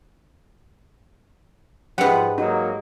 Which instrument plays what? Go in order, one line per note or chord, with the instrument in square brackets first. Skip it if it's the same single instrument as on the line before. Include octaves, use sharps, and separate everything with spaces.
[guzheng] G#2 G3 [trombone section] F3 [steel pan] B4 F#5
[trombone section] F#3 A#3 F#4 [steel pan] D#4